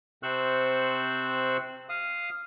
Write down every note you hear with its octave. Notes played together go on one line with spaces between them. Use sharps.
C3 C4 C5 C#6 E6 F#6
F5 D#6